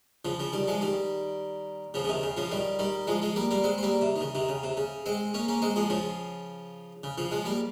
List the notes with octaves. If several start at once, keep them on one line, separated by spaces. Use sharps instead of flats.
C#3 F3
C#3 F3
D#3 G3
F3 G#3
D#3 G3
C#3 F3
C#3
C3 D#3
C#3
C#3 F3
D#3 G3
D#3 G3
F3 G#3
F3 G#3
G3 A#3
G3 A#3
G#3 C4
C4
G3 A#3
C3
D#3
C#3
C3 D#3
C#3
C3
C#3
G#3 C4
A#3 C#4
A#3 C#4
G#3 C4
F3 G#3
C#3 F3
C#3
C#3 F3
F3 G#3
G3 A#3